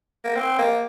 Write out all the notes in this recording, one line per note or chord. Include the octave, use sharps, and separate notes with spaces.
A#3
C4
A#3